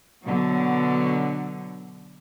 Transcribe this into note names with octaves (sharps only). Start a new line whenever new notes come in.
B2 D3 F#3